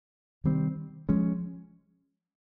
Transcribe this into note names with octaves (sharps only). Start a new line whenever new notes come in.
C3 D#3 G3 C4
F3 G#3 C#4